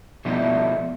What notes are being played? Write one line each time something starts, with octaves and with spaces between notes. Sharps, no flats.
B2 F3 G3 A3 D#4 E4